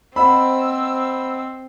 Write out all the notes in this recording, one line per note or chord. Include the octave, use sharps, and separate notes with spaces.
C4 C5 D#5 F#5 B5 E6